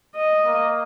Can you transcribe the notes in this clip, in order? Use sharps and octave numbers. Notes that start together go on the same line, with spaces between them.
D#5
A#3